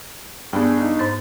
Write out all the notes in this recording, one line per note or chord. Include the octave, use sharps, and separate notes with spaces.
G2 B3 D4 G#4 G5
D#4
G#2 C5 A6